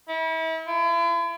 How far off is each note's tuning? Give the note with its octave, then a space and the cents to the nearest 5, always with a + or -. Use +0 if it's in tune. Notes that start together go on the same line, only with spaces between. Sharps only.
E4 -35
E4 +45